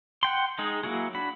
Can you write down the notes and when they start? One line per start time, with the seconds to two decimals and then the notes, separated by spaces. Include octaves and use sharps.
0.23 F#5 G5 C6
0.59 G#3 D#4 G#4
0.83 F#3 A#3 E4 F#4 G#4
1.14 D4 F#4 B5